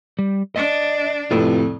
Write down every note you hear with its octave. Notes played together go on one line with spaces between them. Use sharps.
G3
D4 D#5
F2 A2 C3 F4 B4